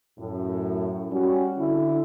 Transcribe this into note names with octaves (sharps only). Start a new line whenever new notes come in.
F#2 A2
G3 C#4 F#4
D3 E4